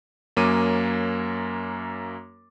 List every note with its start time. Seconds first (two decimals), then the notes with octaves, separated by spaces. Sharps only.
0.37 F#2 A#3 C#4 D6 D#7